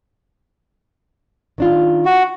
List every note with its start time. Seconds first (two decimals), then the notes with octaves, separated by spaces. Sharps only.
1.58 D#3 D4 F4
2.05 F#4